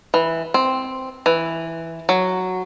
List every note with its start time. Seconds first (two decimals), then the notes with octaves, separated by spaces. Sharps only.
0.14 E3
0.54 C4
1.26 E3
2.09 F#3